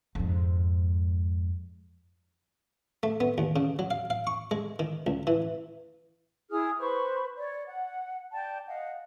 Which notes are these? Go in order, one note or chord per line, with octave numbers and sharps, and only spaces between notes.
F2 G#2
A3
B3
D#2
C#3
F#3
F5
F5
C#6
G#3
D#3
C#2
E3
E4 G#4 D#6 F6
B4 C5 B5 C#6
C#5 D5
F#5
D5 G5 A5
D#5 F5 F#5